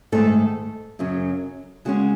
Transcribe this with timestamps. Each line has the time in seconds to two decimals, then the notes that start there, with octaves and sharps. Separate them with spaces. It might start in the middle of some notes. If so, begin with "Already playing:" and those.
0.12 G#2 D#3 A3 A4
0.99 F#2 C#3 F#3 C#4
1.85 C#3 G#3 C#4 F#4